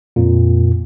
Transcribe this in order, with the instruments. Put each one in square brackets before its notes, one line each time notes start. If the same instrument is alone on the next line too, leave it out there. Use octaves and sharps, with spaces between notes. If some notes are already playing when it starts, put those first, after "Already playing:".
[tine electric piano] F2 A#2